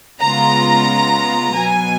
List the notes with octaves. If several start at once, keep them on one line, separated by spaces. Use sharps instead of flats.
C#3 G#3 B3 F4 A#5
B2 F#3 B3 G#5